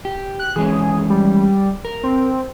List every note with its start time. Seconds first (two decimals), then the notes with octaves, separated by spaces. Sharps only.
0.05 G4
0.39 F#6
0.56 E3 G#3 C#4 G#4
1.10 G3
1.85 A#4
2.03 C4